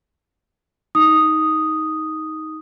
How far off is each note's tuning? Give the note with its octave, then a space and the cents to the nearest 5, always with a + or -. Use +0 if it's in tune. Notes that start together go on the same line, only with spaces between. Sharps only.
D#4 +15 D#6 +0